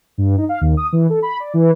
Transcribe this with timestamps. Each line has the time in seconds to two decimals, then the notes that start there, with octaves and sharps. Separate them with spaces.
0.18 G2
0.38 D#4
0.49 F5
0.61 D#2
0.77 D#6
0.92 E3
1.10 A4
1.22 B5
1.40 D5
1.54 E3